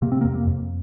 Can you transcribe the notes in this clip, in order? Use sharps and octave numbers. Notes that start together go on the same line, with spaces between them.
C3 A#3
C4
A#3
F2
A#3
F2